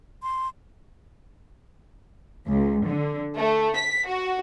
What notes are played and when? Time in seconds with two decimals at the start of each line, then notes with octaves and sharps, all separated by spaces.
0.23 C6
2.47 C#2
2.87 D3
3.36 A3
3.76 B6
4.06 F#4